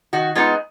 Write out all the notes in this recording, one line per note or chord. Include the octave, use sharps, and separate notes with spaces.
D#3 F#4
G#3 B3 D#4 F4